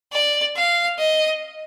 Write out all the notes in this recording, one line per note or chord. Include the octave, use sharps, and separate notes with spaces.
D5
F5
D#5